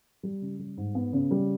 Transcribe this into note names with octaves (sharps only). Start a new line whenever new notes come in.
G3
C#3
G3
G#2
B3
C#3
G3